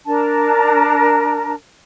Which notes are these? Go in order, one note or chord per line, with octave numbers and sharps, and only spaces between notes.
D4 A#4 A5 A#5